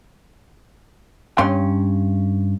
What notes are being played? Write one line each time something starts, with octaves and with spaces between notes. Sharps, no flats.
G2 C#4 G5 C6